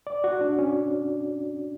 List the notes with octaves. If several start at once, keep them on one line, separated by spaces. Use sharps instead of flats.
D5
F#4
D4
C#4